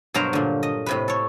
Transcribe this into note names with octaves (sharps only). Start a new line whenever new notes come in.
G2 B2 F#3 A#4 C5 A#5
A#2 D3
D#5
A2 C3 B4
A4 C#5